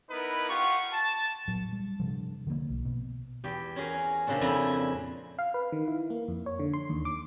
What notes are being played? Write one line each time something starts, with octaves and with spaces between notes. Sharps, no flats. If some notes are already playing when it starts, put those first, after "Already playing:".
B3 D#4 E4 A#4 B4
F4 G4 F#5 C#6
A5
A#2 F#3
G3
G2 C3 F3
D3 F3 G3 A#3
B1
B2
E2 G4
C#4 F#4 G#4 A#4
A#2 C#3 C4 D4 F#4
F2 E4 E5 G#5 A#5
F5
B4
D#3
E4
A#3
F2
C#5
D3
C6
D#2
D6